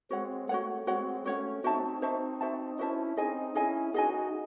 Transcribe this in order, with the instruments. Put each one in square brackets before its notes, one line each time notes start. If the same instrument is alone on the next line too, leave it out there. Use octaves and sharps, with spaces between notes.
[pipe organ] G#3 C4 [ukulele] F#4 C#5 F#5
[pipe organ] A3 [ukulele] F#4 C#5 F#5
[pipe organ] G#3 C4 [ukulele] F#4 C#5 F#5
[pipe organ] A3 C#4 [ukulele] F#4 C#5 F#5
[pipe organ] C4 D#4 [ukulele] F#4 C5 E5 A5
[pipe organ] C4 D#4 [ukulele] F#4 C5 E5 A5
[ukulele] F#4 C5 E5 A5
[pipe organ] C#4 E4 [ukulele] F#4 C5 E5 A5
[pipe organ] C4 D#4 [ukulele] G#4 D#5 G#5
[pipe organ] C#4 E4 [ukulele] G#4 D#5 G#5
[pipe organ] D#4 F#4 [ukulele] G#4 D#5 G#5